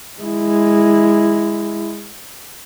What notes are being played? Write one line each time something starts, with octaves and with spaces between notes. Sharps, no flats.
G#3 E4